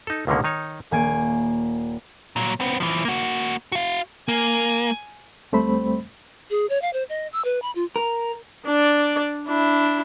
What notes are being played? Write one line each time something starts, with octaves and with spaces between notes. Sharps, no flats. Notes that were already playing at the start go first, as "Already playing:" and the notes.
D#4 A4
C#2 B2 D3 D#3 A#3 C#4
D#3 D#4 C#5
D#1 A#3 G#5 G#6 D7
A#2 F#3
B3 C4
E3 F3
A#3 F#4
F#4 F5
A#3 G#5
D2 G3 A3 C4 C5 B5
G#4
C#5
F5
C5
D#5
E6
B4
B5
F4
A#4
D4 D5
D4 E4